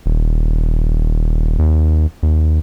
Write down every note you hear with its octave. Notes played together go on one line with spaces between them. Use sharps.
D#1
D#2
D#2